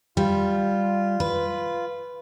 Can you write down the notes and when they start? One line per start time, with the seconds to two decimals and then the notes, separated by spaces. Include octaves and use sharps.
0.17 G3 F4
1.20 B4